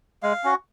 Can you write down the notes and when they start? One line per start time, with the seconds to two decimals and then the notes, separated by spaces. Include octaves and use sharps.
0.23 G#3 F5
0.44 C#4 F#4